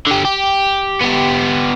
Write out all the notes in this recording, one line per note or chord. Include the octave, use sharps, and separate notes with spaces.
D3 G4
G4
B3 G4